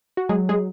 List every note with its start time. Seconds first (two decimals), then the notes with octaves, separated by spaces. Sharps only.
0.17 F#4
0.29 F#3 G#3 G#4
0.49 G#3 G#4